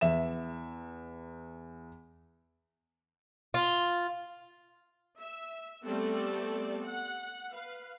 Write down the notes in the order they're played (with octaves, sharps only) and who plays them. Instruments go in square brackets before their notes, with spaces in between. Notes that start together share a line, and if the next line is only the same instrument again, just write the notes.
[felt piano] E2 E5 E7
[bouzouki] F4
[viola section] E5
G3 A3 B3 C4 A4 D5
F#5
B4 F5